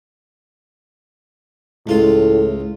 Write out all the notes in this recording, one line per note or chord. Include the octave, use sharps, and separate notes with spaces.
C#2 A2 F4